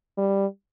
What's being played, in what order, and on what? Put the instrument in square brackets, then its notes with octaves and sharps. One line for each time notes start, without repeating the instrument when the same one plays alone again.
[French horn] G3